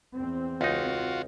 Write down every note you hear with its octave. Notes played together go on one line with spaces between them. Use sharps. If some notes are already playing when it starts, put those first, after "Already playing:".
E2 C4
C#2 D#4 F4 F#4